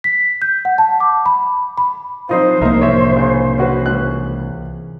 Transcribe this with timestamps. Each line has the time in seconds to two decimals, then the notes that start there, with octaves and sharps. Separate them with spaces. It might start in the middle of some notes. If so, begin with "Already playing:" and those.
0.04 B6
0.42 G6
0.65 F#5
0.78 A5
1.00 D6
1.26 B5
1.78 B5
2.29 A#2 F3 F#3 C4 D#4 F4 C5
2.62 C2 A#3 D#4 A#4 E5
2.81 A2 C3 G4 C#5 E5
3.16 C#3
3.58 E3 C#4 F#4 G#4 B4
3.86 C#2 C#4 F#6